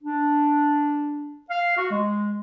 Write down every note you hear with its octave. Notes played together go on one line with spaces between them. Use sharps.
D4
F5
F#4
G#3